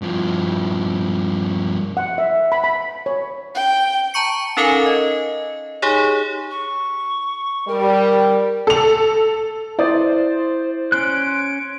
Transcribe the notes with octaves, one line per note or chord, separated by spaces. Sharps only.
G2 F3
F#5
E5
B5
B5
C#5
G5
A5 A#5 C#6 C#7
C#4 D#4 A4 A#4 F5 G#5
D#5
D#4 G4 G#4 C#5
C#6
G3 A#4
A4 F7
E4 C5 D5 D#6 A6
C#4 C6 F#6 D7